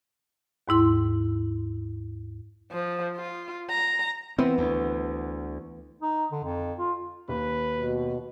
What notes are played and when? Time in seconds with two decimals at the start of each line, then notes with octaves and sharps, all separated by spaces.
0.68 D#2 G#2 E4 C6
2.72 F3
3.16 F4
3.70 A#5
4.38 E3 B3 C4
4.58 D2
6.02 D#4
6.32 D3
6.44 F2
6.78 F4
7.28 D#2 B4
7.76 B2